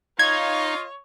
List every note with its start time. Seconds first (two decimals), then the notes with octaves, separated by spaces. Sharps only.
0.19 D#4 F4 C#5 D#5 F5 G#6